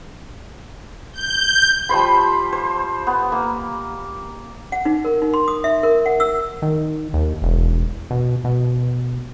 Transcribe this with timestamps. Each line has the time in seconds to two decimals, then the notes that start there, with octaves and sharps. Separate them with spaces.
1.12 G6
1.89 F3 G3 C5 B5
2.53 C5
3.07 B3
3.32 A#3 A#5
4.72 F#5
4.85 D#4
5.05 A#4
5.22 D#4
5.34 C6
5.48 D#6
5.64 E5
5.83 A#4
6.06 F#5
6.20 E6
6.62 D#3
7.14 D#2
7.42 E1
8.11 B2
8.44 B2